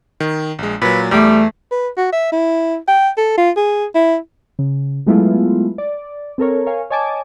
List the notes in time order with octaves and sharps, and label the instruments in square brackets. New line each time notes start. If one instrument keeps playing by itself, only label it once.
[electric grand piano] D#3
A#1 G#3
[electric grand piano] A#2 F#3 [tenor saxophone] B4
[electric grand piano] E2 D6 [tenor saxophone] G3 [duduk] A3
[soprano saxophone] B4
F#4
E5
E4
G5
A4
F4
G#4
E4
[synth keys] C#3
F#3 G#3 A3 B3 E4 F4
D5
C4 A4 A#4 C#5
A#4 C#5 F5 G#5
C#5 D#5 G#5 A5 D6